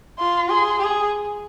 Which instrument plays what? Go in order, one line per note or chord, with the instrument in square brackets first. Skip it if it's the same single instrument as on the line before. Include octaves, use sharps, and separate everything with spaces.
[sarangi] F4 [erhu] C6
[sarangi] G#4 [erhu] C6
[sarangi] G#4